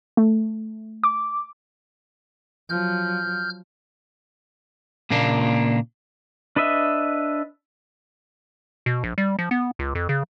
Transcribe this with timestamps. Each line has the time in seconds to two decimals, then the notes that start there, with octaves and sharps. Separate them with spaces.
0.17 A3
1.04 D6
2.70 F3 F#3 F6 G6
5.10 A#2 C#3 A#3 D4
6.56 D4 B4 D#5 E5
8.86 B2
9.04 A#1
9.18 G3
9.39 F3
9.51 B3
9.79 C#2
9.95 F2
10.09 C#3